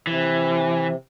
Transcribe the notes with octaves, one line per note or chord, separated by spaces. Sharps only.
C3 E3